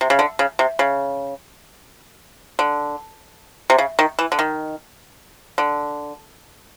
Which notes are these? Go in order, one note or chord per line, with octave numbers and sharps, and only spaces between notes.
C3
C#3
D3
C#3
C3
C#3
D3
C3
C#3
D#3
E3
D3
D#3
D3